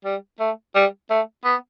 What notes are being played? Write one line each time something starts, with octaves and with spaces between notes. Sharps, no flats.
G3
A3
G3
A3
B3